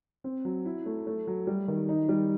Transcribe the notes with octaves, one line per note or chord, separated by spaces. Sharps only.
C4
F#3
E4
A3
A3
F#3
G3
D#3
D#4
G3